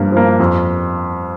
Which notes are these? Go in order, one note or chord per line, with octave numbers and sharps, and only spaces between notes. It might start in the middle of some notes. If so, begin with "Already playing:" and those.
Already playing: G2 F3 A#3
F3 A#3
F2